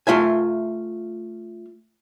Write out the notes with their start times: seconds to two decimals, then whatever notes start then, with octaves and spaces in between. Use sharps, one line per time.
0.07 A3 F4 E5 G#5